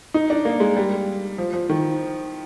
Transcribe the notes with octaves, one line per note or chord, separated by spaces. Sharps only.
D#4
D4
A#3
G#3
G3
F3
F3
D#3